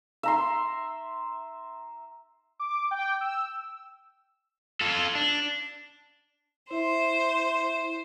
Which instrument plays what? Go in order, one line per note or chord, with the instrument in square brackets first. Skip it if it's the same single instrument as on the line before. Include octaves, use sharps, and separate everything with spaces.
[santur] E5 A#5 C6
[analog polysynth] D6
G5
E6
[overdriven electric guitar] F4 A4
D4
[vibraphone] E4 E5 C6 [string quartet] C5